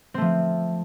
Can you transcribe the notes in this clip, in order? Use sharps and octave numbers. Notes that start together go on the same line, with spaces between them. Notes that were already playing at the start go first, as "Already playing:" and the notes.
F3 A3 C4